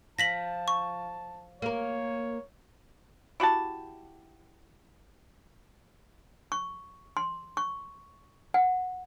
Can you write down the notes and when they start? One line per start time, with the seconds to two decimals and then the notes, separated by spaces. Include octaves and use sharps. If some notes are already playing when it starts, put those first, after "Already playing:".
0.19 F3 A5 A#6 B6 F#7
0.68 C#6
1.62 A#3 A#4 C#5
3.40 E4 F#4 G4 A5
6.52 C#6
7.17 C6
7.57 C#6
8.54 F#5